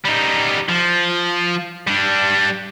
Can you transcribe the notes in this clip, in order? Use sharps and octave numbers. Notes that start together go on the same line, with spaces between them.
G3 D#4
F3
G3 D4